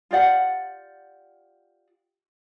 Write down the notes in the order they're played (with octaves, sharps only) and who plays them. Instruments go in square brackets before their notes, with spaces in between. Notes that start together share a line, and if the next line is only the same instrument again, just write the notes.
[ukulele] F4 G4 D5 F#5